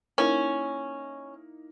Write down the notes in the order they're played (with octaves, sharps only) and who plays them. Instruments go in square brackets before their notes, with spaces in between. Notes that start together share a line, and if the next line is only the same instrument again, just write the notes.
[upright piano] A#3 D#4 E4 [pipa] C#4